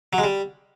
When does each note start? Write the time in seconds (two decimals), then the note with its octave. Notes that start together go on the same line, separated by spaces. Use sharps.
0.13 F#3
0.18 G#3
0.24 G3